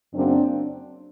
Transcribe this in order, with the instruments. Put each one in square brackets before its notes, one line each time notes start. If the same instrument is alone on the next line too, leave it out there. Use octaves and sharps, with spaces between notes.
[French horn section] F#2 C#3 F#3 A#3 C4 D4